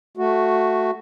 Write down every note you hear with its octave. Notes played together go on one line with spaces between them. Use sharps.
A3 F#4